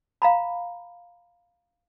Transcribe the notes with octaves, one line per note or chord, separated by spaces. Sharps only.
F5 A#5 B5